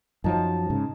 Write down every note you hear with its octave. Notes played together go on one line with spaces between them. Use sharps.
F#2 F3 F#3 D#4 A5
G#2 C#3